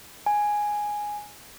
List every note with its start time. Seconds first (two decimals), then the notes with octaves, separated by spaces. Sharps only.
0.26 G#5